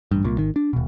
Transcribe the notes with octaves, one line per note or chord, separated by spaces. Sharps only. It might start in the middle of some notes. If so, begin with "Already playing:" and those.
A1 G2
C2 A#2
G#1 D#3
D4
D#1 B2